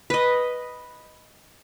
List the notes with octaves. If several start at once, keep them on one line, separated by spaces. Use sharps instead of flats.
B4 D#5